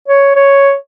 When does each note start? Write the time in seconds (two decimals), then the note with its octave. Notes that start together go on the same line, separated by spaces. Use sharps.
0.08 C#5
0.36 C#5